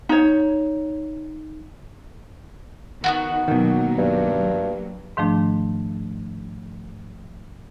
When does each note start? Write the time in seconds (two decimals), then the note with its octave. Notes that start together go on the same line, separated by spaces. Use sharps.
0.09 D#4 C#5
3.04 D#3 B3 F4 F#4
3.48 B2 D#3 F#3 A#3
3.98 G2
5.17 G#2 D#3 F3 A3 D4